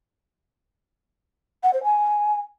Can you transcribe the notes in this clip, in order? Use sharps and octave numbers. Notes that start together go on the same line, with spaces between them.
F#5
C5
G#5